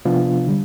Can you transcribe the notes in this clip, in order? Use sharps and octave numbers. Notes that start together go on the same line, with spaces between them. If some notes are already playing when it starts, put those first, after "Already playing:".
C3 F3 B3 D4 F4
D3 G3